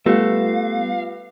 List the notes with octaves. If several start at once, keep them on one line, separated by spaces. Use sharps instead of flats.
G3 A3 B3 F4 G4 B4 F5 A#6